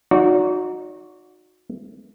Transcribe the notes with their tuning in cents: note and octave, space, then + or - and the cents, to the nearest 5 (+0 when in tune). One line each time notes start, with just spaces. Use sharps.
D#4 -5 F#4 -25 D5 -45